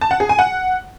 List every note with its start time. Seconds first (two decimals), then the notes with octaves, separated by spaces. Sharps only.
0.01 A5
0.11 F#5
0.20 G#4
0.29 G#5
0.39 F#5